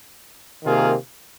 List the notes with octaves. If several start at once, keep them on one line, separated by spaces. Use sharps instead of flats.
C3 D#3 A#3 F4 G#4